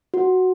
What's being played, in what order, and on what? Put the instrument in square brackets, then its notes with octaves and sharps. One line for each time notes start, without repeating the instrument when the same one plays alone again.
[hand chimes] F#4